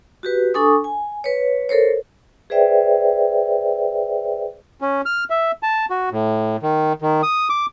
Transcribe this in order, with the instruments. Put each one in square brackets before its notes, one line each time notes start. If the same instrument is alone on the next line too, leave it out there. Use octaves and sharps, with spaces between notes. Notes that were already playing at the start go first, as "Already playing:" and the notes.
[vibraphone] F#4 G4 B4
D4 A4 G#5 C#6 D#6
G#5
B4 C#5
A4 A#4 C5 C#5
G#4 B4 C5 D5 E5 G5
[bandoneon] C#4
F6
E5
A5
F#4
A2
D#3
D#3
D#6
D6